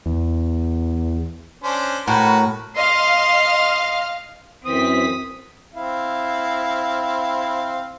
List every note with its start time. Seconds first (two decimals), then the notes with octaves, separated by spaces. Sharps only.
0.06 E2
1.63 C#4 D4 C5
2.08 A2 F#4 A#4 B4
2.76 D#5 F5 C6 F6
4.66 F#2 E3 C4 D#6 B6
5.74 C4 E4 F5